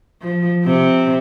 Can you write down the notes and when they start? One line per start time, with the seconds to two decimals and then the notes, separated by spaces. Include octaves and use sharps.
0.21 F3
0.64 C3 C4